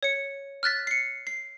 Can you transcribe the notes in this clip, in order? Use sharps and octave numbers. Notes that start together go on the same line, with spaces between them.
C#5 C#7
F6 F#6 A6 B6
C7 C#7
C7